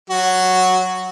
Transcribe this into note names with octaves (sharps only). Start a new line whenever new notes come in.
F#3 F#4